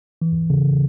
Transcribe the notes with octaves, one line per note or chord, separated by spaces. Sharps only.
E3
C#3